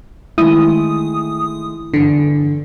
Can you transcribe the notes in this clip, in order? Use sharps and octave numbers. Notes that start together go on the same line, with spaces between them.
D#3 G#3 A3 E4 D#6
E2 G2 D3